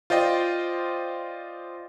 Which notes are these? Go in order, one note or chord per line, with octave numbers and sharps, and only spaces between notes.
F4 C5 D5 D#5 G5